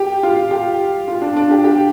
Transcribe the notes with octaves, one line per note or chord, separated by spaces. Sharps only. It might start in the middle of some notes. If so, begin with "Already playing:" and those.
Already playing: G4
F4
G4
F4
D4
D4
G4
G4